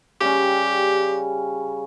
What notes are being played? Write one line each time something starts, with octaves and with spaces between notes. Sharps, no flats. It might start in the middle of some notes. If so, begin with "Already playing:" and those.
C#3 G3 C#4 G4